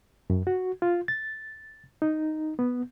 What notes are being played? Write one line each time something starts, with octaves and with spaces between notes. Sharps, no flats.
F#2
F#4
F4
A6
D#4
B3